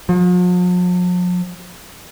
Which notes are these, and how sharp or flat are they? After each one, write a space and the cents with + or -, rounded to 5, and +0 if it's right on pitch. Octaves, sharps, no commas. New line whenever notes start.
F3 +45